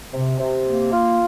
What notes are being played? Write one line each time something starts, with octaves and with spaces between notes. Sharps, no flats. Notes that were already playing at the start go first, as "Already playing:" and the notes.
C3
C3
A#3
F4